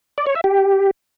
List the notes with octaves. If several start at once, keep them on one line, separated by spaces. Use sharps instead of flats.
D5
C#5
E5
G4